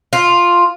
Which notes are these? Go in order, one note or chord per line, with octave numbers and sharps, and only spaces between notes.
F4